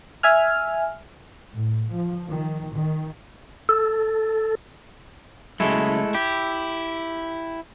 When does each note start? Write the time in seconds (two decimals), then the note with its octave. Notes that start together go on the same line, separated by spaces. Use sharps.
0.23 E5 G#5 F6
1.54 A2
1.93 F3
2.28 D#3
2.74 D#3
3.69 A4
5.60 C#3 F#3 G#3 A3 E4
6.15 E4 G4